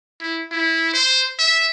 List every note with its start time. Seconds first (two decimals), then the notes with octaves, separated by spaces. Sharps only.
0.21 E4
0.51 E4
0.94 C5
1.39 E5